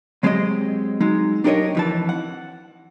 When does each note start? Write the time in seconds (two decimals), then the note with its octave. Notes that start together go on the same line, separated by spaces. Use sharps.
0.23 F#3 G#3 C4 G4 D#5
1.01 F#3 G#3 D#4
1.44 D4 D#4 G4 A#4 C#5 D#5
1.75 F2 E3 A5
2.09 F#5